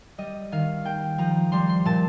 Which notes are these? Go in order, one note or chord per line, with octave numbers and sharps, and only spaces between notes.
G3 D#5
D#3 F5
A#3 G5
F3 A#5
G3 C6
C6
A#2 A5